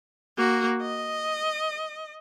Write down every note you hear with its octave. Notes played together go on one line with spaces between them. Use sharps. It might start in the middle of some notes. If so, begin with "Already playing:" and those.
A#3 F#4
D#5